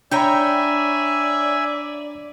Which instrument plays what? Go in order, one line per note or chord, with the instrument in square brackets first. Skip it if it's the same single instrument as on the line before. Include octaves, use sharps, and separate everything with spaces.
[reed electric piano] D4 A#5 B5 [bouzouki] C#5 G5 [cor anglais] D5 [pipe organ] E5 G#5